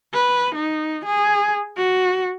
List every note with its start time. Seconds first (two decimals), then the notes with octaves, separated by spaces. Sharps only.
0.14 B4
0.55 D#4
1.05 G#4
1.77 F#4